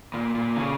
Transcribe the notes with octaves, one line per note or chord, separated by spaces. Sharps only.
A#2
A#2
C#3